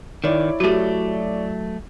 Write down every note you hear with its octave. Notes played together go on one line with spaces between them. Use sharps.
D#3 E4 C#5 D5
F#3 A3 F#4 G4